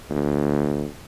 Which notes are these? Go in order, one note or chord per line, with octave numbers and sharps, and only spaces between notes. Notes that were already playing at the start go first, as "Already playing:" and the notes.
D2